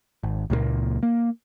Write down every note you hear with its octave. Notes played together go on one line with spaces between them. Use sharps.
G#1
C#2 A#2 F#3 A#3
A#3